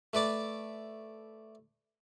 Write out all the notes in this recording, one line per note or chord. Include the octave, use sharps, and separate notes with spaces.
A3 B4 D5 D6